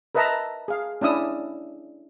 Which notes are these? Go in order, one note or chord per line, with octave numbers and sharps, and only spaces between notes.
A#4 B4 D#5 E5 A5 A#5
G#4 F5
C#4 D4 E4 D#6 E6